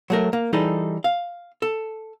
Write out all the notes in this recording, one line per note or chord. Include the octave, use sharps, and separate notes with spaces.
F#3 A3 A#4
A#3
E3 G3 D#4 G#4 A4
F5
A4